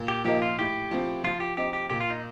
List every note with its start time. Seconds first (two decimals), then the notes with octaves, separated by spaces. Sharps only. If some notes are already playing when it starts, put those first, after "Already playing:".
Already playing: A#2
0.08 G4
0.25 F3 A#3 D#4 G4
0.42 F4
0.59 A2 G4
0.91 F3 C4
1.24 F3 F4
1.40 G4
1.57 C4 D#4 G4
1.73 G4
1.90 A#2 G4
2.00 F4
2.10 D#4